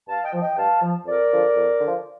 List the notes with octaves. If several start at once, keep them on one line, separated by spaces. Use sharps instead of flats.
G2 F5 A5
D#5 G5
F3
D#5 G5
G2 F5 A5
F3
F2 A#4 D5
D3 F3
F2
D3 F3